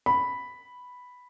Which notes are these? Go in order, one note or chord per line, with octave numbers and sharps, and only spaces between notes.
B5